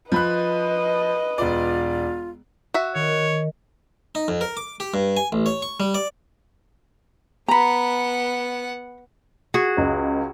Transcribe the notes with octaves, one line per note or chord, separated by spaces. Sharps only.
F3 B4 D#5 B5 F#6
E1 F4 D5
F#4 E5
D#3 C#5
D#4
F2
A#4
D6
G4
G2
G#5
A1
C#5
C#6
G3
D5
B3 F#5 A#5 B5
F#4 G#4
C#2 D#5